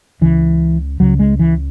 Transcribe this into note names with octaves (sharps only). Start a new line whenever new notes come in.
C#2 C#3 E3
C#2 C#3 F#3
G#3
E3